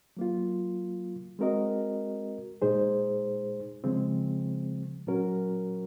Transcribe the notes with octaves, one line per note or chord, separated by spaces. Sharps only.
F#3 A#3 F4
G#3 C4 F#4 A#4 D#5
A#2 G#3 D#4 G#4 C5
C#3 F3 G#3 C4
A#2 F#3 C#4 F#4 A#4